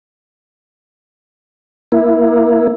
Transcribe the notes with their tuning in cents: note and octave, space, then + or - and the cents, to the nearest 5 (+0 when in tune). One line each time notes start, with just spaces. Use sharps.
A#3 +15 E4 +0